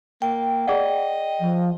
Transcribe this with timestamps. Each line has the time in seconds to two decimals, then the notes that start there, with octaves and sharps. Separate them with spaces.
0.22 A#3 G5
0.67 G#4 D5 D#5 F#5
1.40 F3